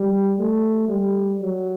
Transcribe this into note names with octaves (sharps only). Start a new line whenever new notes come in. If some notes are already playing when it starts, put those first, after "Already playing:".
Already playing: G3
A3
G3
F#3